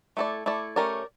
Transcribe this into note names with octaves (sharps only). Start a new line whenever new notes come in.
A3 E4 A4 D5
A3 E4 A4 D5
A3 C#4 G4 A#4 D5